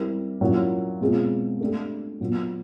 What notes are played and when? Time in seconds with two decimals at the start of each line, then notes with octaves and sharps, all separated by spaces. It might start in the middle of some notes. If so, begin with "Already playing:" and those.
Already playing: G3 C4 E4 G4 A#4
0.41 A#2 F#3 A#3 C#4 E4
1.01 B2 G#3 C4 F4 G#4
1.60 A3 D4 G4
2.20 A#2 F#3 B3